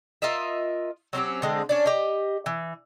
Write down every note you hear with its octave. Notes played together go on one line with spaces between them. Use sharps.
F4 A#4 D#5 E5
F#3 C4 C#4 G4
D3 G#3 C4
C#4 D4 D5
G4 D#5
E3